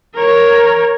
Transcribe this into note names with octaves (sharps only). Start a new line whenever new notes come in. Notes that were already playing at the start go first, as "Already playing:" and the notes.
A#4 C#5